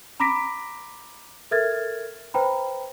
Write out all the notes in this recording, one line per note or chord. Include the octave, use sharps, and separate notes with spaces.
A#5 B5 D6 A#6 B6 D7
A4 A#4 E5 F6 G#6 A6
B4 C5 G5 A#5 B5